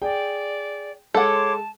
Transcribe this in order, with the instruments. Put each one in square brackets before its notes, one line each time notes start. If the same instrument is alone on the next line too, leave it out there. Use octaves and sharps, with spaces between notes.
[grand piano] G#4 G5 [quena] D5
[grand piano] G#3 [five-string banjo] A4 F#5 [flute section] C#5 C6 D6 [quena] A5